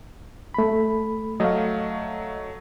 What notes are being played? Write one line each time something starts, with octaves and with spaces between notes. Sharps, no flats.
A3 B5
F#3 A3 D#5 F5